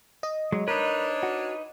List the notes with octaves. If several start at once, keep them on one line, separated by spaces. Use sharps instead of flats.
D#5
F#3 G#3
D4 D#4 A#4 B4 C#5
F#4